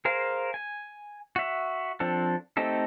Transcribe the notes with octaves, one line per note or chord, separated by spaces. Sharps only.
G#4 A#4 C5 F5
G#5
F#4 E5
F3 C4 D4 A4
A3 C4 D#4 G4 A4